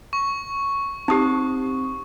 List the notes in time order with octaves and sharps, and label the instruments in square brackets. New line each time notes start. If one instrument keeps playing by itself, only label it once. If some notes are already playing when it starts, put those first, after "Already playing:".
[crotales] C#6
[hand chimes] C4 D#6 [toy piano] D#4 G4